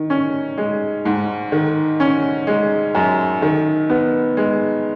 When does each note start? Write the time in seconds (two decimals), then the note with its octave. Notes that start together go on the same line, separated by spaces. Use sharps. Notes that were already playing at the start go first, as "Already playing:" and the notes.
Already playing: D#3
0.10 C#4
0.58 G#3
1.05 G#2
1.52 D#3
2.00 C#4
2.47 G#3
2.95 F#2
3.42 D#3
3.90 B3
4.37 G#3